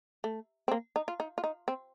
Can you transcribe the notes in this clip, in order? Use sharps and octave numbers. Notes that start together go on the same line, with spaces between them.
A3
C4
A#3
D#4
F4
D#4
F4
D#4
C4